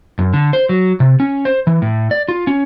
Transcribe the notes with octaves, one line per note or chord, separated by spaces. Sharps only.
F#2
D3
C5
F#3
C3
C#4
C5
E3
A2
D5
F4
C#4